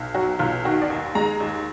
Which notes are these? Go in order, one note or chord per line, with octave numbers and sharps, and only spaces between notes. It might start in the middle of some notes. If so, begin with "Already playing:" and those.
Already playing: B1
F#3 F#4
B1 F4
D#3 F#4
D5
D#2
G#3 A#5
D#2